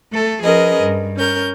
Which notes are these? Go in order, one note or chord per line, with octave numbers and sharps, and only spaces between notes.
A3 A4
F3 C#4 G#4 A#4 B4 D#5
G2
C#4 A#4 G6